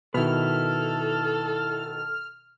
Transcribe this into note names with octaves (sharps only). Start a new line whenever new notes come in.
B2 D#3 E4 A4 B4 F6